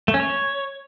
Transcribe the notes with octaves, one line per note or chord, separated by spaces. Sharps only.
A3
C#4
C#5